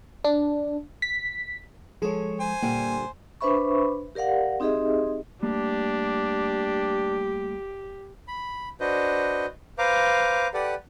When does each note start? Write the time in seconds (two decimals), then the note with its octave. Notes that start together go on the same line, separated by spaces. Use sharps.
0.24 D4
1.02 B6
2.02 F3 G#3 G#4 A4 C#5
2.40 C5 G#5
2.62 A#2 D3 G3 A#3 G5
3.41 D4 B4 C5 E5 B5 C#6
4.15 G4 A#4 D5 F5 F#5
4.60 C4 D#4 G4 G#4 D#5 E5
5.43 G3 A3 A#3 D4 G4
8.28 B5
8.80 D4 F#4 B4 C5 D#5
9.78 B4 C5 F5 A#5 D6
10.54 G4 A4 B4 D5 F#5